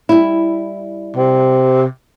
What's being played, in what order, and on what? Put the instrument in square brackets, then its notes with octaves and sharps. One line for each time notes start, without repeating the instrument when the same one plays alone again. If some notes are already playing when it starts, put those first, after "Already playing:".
[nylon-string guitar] G3 E4
[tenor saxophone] C3